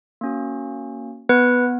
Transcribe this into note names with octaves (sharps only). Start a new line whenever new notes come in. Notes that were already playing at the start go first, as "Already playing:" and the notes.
A#3 C#4 F#4
B3 B4